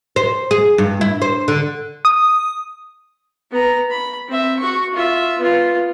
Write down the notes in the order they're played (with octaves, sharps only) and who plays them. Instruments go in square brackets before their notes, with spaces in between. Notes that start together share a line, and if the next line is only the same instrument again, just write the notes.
[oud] C5
G#4
G2
E4
C5
D3
[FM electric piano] D#6
[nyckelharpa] B3 A#5
B5
C4 E5
F#4 C#6
F4 E5
B3 F4